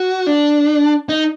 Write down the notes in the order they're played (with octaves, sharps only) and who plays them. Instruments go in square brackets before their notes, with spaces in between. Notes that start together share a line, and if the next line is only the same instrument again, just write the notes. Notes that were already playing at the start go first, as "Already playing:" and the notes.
Already playing: [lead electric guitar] F#4
D4
D#4